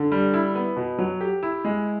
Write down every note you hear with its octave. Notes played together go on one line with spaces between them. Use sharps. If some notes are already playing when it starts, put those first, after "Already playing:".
Already playing: D3
G3
E4
B3
B2
F#3
G4
E4
G#3